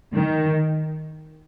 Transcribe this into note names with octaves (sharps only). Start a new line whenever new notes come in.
D#3